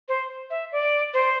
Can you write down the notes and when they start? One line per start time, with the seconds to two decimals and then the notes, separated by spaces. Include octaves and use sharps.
0.09 C5
0.50 E5
0.72 D5
1.14 C5